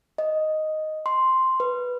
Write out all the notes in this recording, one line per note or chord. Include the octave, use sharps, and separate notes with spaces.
D#5
C6
B4